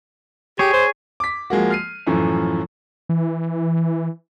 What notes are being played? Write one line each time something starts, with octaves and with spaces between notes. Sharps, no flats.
G4 G#4 C#5
C5
D6 B6
F3 G#3 A#3 F#4
F6 C7 D#7
F#2 A2 E3 F3
E3